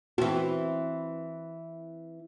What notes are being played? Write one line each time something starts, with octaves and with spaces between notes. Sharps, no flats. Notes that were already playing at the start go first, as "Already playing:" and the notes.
E3 C4 F#4